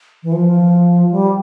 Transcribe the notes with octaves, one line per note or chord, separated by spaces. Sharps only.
E3
F3
G3